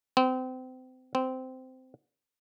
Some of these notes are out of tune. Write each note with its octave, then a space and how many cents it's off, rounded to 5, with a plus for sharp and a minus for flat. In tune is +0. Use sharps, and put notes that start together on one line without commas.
C4 -30
C4 -15